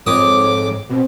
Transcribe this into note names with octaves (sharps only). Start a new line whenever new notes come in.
F2 G#2 C#5 D6 D#6
B2 C4